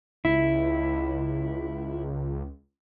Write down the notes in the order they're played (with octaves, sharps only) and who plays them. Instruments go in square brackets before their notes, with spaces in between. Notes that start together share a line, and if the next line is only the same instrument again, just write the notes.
[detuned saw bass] C#2 [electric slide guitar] E4